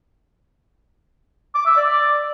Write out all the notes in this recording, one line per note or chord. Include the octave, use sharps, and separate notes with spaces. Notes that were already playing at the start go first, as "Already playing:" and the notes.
D6
E5
D5